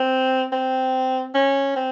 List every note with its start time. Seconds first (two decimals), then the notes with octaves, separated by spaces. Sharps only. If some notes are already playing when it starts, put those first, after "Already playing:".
Already playing: C4
0.52 C4
1.35 C#4
1.76 C4